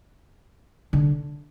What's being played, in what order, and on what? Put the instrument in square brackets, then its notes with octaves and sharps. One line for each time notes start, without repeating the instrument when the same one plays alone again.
[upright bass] D3